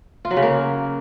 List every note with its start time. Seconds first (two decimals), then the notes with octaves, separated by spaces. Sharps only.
0.25 F4
0.31 F#3
0.37 C#3
0.43 A#3